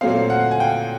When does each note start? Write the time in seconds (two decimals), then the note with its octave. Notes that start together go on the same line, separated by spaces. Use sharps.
0.01 A#2 F#3 A3 C4 F5
0.30 F#5
0.51 G#5
0.60 G5